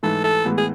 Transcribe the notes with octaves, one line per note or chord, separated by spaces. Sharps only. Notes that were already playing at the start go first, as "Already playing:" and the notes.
G#2 E3 A3 A4
A4
A2 E3 G#3 B3
G#4